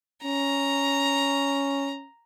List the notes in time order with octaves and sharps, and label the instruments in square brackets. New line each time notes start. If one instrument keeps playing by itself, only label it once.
[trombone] C#4 [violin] A#5